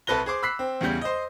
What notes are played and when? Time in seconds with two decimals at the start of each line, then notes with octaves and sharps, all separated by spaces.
0.07 C2 A4 B4 F#6 A#6 G7
0.26 G#4 C5 D6
0.42 B5 E6 F#6 B6 C7
0.59 C4
0.81 E2 C#3 G3 G6
1.01 C5 D#5